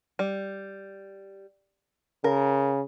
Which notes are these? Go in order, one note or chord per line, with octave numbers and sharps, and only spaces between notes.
G3
C#3 A#4